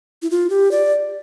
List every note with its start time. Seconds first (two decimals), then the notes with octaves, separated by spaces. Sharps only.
0.22 E4
0.30 F4
0.50 G4
0.71 D5